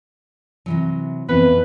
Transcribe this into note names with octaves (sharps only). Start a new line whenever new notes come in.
C3 E3 F#3
F2 E3 B3 C4 B4